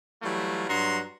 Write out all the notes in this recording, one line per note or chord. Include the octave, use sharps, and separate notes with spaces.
E3 F#3 G3 A3 F4
G2 F#3 F#4 A#5 C6